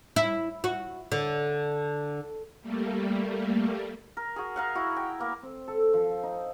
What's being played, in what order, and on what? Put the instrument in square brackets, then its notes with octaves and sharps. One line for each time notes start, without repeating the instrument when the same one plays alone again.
[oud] E4
F#4
D3
[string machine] G3 A3 A#3
[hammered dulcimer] A#4
F#4 G#4
A#4 F5 F#5
E4 F#4
G5
A#3 B3
C4
A4
F3
D#4